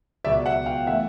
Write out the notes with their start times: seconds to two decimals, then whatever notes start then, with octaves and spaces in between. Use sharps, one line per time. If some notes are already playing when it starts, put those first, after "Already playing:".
0.24 C#2 B2 F#3 B3 D5 E5
0.46 E5 F#5
0.66 F5 G5
0.87 E3 A3 E5 F#5